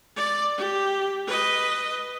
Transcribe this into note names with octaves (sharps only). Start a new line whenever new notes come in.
D5
G4
B4 D#5